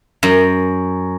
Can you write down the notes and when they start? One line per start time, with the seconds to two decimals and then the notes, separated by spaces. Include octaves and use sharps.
0.23 F#2